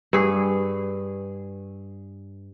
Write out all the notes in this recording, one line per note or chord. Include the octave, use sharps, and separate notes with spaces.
G2 G#4